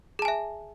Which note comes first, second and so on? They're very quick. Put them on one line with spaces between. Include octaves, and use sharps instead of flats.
G#4 A5 G#5 E5